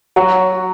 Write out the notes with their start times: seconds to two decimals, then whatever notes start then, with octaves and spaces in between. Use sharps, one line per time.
0.16 F#3 F#4